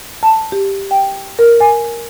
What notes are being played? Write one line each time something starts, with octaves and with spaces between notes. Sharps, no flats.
A5
G4
G5
A#4
G#5